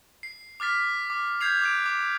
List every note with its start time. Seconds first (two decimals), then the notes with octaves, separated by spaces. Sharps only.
0.23 C7
0.60 D6 F6 A6 B6
1.10 D6
1.41 G6 G#6 C7 F7
1.62 D6 F#6 D7
1.86 D6